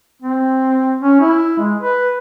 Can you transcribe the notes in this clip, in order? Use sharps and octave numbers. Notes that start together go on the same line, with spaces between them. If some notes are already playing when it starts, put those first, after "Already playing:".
C4
C#4
E4
G#3
B4